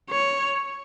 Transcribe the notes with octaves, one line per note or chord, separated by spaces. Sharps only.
C#5